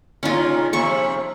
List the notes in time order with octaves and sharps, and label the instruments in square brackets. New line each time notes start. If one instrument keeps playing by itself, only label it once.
[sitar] A#2 C#3 D#4 [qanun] C#4 F4
[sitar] C3 F3 [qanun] E5 C#6